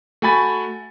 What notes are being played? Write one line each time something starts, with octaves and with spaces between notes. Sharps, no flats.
A3 F#4 G#5 B5 A6